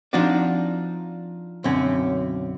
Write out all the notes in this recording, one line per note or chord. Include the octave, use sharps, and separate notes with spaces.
F3 C4 D4 D#4 F#4 D5
B1 F#2 D3 C4 C#4